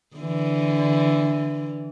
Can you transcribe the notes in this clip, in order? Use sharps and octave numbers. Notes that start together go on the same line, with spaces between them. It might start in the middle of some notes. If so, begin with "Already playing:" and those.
D3 E3